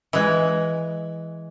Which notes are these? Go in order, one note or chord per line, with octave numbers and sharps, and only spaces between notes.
E3 G#3